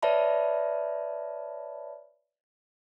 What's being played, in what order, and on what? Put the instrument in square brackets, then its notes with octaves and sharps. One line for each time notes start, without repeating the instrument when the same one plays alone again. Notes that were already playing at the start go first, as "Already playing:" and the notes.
[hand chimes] B4 C#5 D5 E5 A5 B5